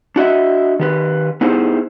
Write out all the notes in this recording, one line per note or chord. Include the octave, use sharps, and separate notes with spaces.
D4 F#4 D#5 E5
D#3 G4 B4
B3 D#4 E4 G4 G#4 C5